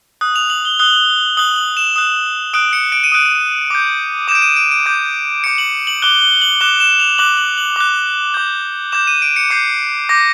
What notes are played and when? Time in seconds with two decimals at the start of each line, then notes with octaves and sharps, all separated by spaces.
0.21 D#6 F#6
0.36 F7
0.50 F#7
0.65 G7
0.79 D#6 F#6 G7
1.37 D#6 F#6 F#7
1.56 F#7
1.77 E7
1.96 D#6 F#6
2.54 D#6 F#6 D7
2.73 C#7
2.92 D7
3.04 D#7
3.12 D#6 F#6 D7
3.70 D6 G6
4.28 D6 E7
4.32 G6 D7
4.42 D#7
4.56 D7
4.72 D7
4.86 D6 G6
5.44 D6 G6 C#7
5.58 F#7
5.87 F#7
6.02 D6 F#6 G7
6.22 G7
6.42 F#7
6.61 D6 F#6 E7
6.80 E7
6.99 F7
7.18 D6 F#6 F#7
7.37 F#7
7.58 F#7
7.76 D6 F#6
8.34 D6 G6
8.92 D6 G6 E7
9.07 D#7
9.22 D7
9.36 C#7
9.50 D6 G6 C7
10.09 D6 G6 A#6